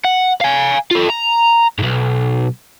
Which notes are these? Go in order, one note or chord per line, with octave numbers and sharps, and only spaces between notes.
F#5
F5 G#5
F4 A4
A#5
B1 G#2